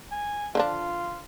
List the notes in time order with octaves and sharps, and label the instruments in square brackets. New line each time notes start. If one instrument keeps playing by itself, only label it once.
[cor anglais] G#5
[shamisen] D3 F3 D4 [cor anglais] F4